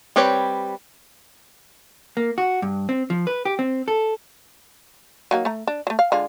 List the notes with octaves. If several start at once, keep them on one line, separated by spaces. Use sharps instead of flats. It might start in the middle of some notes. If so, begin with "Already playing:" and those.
G3 C4 G4 B4 C#5
A#3
F#4
G2
C4
F3
B4
G4
C4
A4
F#3 A#3 D#4
A3 A#5
D4
F#3 A3
F5
D3 G#3 F4